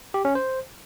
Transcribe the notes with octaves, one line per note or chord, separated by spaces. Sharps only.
G4
C#4
C5